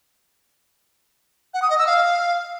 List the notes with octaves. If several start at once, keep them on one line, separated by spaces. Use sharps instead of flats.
F#5
D#6
D#5
E6
F5